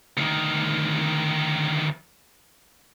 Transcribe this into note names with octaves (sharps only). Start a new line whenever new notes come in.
D2 D#3